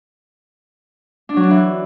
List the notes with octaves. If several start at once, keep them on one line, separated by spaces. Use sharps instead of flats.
D4
F#3
D4
E3